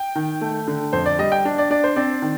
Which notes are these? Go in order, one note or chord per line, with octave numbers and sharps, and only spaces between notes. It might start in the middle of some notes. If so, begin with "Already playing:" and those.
Already playing: G5
D#3
A3
D3
F2 C5
D5
G3 D#5
G5
D4
D5
D4 D5
C5
C4 D5
D#3